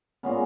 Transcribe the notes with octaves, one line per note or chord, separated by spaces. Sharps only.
A#2 G#3 B3 C#4